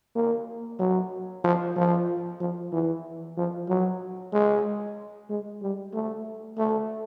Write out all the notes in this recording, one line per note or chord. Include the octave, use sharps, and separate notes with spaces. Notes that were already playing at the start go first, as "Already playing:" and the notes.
A#3
F#3
F3
F3
F3
E3
F3
F#3
G#3
G#3
G3
A3
A3